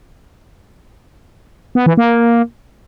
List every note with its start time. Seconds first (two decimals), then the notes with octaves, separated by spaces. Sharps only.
1.75 B3
1.86 E3
1.97 A#3